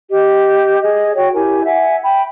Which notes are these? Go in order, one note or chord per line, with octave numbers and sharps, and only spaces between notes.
G4 D#5
G#4 D#5
F#4 C#5 G5
E4 G4 A#4 G#5
E5 F#5 G#5
G5 B5